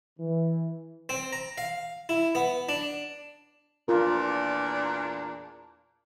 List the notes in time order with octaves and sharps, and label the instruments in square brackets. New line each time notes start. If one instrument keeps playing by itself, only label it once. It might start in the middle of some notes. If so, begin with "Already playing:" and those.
[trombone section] E3
[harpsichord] C4
A#5
F5
E4
B3
D4
[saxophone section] E2 A#2 D4 [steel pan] F4 A#4